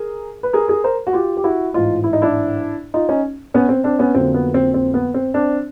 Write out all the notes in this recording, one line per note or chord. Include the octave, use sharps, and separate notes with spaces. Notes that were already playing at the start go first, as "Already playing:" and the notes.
Already playing: G#4 A#4
B4
G#4 A#4
G#4 A#4
A#4 C5
F#4
F4 G4
G4
E4 F#4
A1 G#2 E3 D#4 F4
E4
D#4
D4 E4
D#4 F4
C#4 D#4
B3 C#4
C4
C4 D4
B3 C#4
F2 D3 F#3 A#3 C4
B3
C4
C4
B3
C4
C4 D4